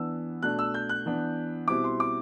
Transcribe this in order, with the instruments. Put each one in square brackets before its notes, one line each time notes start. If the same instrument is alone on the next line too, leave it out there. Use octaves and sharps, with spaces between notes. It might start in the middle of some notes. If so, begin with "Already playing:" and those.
Already playing: [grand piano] E3 B3 D4 E6
B2 A3 D4 F#6
E6
G6
F#6
E3 B3 D4
B2 G3 C4 E4 D6
C6
D6